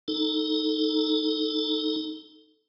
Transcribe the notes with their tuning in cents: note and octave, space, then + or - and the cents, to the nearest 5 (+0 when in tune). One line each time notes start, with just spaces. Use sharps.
D#4 +0 A4 +0